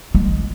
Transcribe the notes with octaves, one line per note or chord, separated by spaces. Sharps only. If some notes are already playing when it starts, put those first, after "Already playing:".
G#3